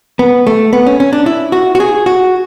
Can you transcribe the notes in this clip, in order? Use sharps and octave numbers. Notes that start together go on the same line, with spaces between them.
B3
A3
B3
C#4
C#4
D4
E4
F#4
F#4
G#4
F#4